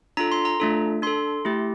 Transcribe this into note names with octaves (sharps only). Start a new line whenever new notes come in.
D4 F4 A4 A#5
C6
A#5
A3 D4 F4 A4
D4 A4 C6
A3 E4 G4